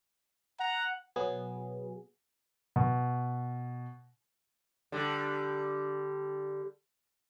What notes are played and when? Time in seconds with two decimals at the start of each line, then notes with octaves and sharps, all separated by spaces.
0.59 F#5 A#5
1.16 B2 F#3 B3 G#4
2.76 B2
4.92 D3 G3